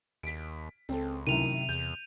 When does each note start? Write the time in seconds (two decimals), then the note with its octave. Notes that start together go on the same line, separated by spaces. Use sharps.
0.23 D#2 B6 D7
0.89 C#2 C4 A4
1.27 F#2 A2 C3 D#3 D#7 F7
1.69 E2 G6